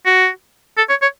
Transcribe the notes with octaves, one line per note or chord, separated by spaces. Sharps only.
F#4
A4
C#5
C#5